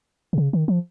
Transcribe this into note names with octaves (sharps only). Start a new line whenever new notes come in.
C3
C#3
D#3
F3